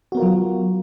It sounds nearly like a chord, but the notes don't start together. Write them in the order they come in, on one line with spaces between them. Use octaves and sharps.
F#4 B3 A#4 F4 F#3